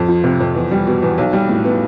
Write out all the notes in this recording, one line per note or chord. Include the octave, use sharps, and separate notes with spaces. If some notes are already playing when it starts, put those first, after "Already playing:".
Already playing: F2
F3
C3
F2
E2
G3
B2
E2
B1
G3
A2
B3